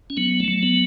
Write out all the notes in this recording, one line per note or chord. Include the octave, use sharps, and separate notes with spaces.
C#4
F#3 B3
A3
F#3
B3